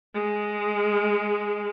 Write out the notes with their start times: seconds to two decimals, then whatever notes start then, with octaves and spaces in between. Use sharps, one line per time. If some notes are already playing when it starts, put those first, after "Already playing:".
0.14 G#3